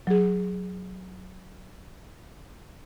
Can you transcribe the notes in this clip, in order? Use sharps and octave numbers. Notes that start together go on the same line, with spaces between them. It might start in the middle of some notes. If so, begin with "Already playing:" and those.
F#3 G#4